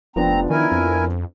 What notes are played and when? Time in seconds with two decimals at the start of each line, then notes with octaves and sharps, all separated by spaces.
0.16 F1 F3 B3 C4 D4 A#5
0.50 D#3 E4 A#4 G#5
0.72 F2